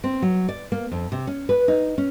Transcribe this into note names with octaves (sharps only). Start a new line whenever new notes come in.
C4
F#3
D5
A#3
F2
C3
C#4
B4
D#4
C#4